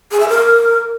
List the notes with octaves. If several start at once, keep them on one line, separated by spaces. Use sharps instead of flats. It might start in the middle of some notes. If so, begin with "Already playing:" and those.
G#4
E5
A#4